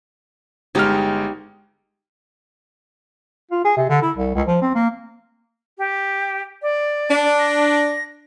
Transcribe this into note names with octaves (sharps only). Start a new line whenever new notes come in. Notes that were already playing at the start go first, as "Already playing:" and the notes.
G1 G#3 D#4 G4 F6
F4
G#4
C3
D3
E4
C2
C#2
F3
C4
A#3
G4
D5
D4
A#6